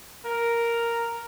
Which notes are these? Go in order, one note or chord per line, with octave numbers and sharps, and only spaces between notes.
A#4